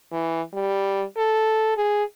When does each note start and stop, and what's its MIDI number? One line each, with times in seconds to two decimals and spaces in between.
0.12 0.41 52
0.54 1.03 55
1.17 1.74 69
1.77 2.03 68